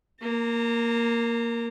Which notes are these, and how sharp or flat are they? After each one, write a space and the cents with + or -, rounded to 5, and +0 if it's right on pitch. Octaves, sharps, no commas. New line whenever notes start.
A#3 +0 A#5 -30